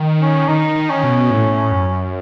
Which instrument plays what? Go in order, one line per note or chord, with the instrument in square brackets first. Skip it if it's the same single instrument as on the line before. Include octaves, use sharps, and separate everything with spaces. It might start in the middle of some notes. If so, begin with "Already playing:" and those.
Already playing: [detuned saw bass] D#3
[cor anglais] C#4
[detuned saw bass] D#3 [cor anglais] D#4
[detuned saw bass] D#3
[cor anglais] C#4
[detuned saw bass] B2
A2
F#2